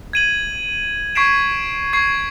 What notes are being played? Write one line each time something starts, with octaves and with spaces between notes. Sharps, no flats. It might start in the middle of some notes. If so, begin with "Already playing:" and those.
G#6 D#7 F#7
C#6 G#6 B6 C7 D7 E7
C#6 G#6 C7